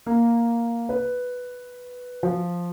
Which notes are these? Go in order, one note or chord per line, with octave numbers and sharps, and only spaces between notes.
A#3
B4
F3